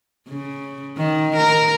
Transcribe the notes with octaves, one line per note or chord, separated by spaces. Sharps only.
C#3
D#3
A#4